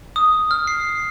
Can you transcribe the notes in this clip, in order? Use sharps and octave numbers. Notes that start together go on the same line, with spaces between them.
D#6
F6
C7